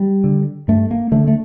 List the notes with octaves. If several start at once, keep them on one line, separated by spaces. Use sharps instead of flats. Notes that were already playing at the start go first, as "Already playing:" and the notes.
Already playing: G3
D3
G2 A3
A#3
D3 A3
A3